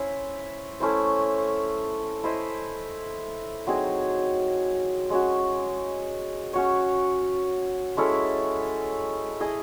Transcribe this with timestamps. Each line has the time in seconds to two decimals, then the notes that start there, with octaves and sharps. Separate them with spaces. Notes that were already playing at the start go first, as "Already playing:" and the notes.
Already playing: C#4 E4 C5 E5
0.80 A3 C#4 E4 C5
2.24 E4 C5 D#5
3.67 F#3 C4 D#4 G#4
5.10 G#3 C#4 F#4
6.53 C#4 F#4 C#5
7.97 G#3 C#4 E4 A4
9.40 E4 G#4 D#5